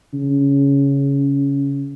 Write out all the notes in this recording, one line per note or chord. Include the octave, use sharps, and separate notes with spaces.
C#3